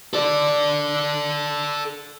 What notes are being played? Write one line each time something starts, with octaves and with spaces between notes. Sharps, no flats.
A4 D5